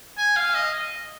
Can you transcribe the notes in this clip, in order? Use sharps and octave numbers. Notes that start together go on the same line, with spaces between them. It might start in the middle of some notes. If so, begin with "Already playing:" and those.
G#5
F5
D#5